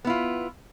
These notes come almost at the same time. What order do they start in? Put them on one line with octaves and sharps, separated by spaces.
B3 E4 F4